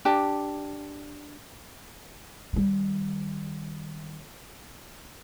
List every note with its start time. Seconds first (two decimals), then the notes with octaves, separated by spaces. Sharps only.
0.05 D4 G4 A5
2.53 D#3 G3